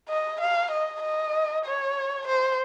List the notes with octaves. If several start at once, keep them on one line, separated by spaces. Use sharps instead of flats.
D#5
F5
D#5
D#5
C#5
C5